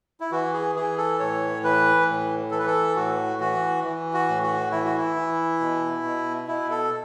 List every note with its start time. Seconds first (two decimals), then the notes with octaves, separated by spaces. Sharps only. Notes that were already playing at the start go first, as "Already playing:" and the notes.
0.20 E4
0.31 E3 F#4
0.54 G#4
0.75 E3 G#4
0.98 A4
1.19 A2 C#5
1.63 E3 B4
2.08 A2
2.51 E3 A4
2.59 B4
2.66 A4
2.96 A2 F#4
3.40 E3 F#4
3.84 E3
4.13 F#4
4.28 A2
4.43 F#4
4.71 E3 E4
4.85 F#4
4.97 E4
5.16 E3
5.60 B2
6.04 B2
6.48 B2 E4
6.70 A4